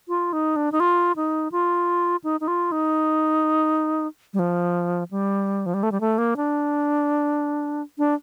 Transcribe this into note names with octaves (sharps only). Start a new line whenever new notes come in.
F4
D#4
D4
D#4
F4
D#4
F4
D#4
D#4
F4
D#4
G3
F3
G3
F3
G3
A3
G3
A3
A#3
D4
D4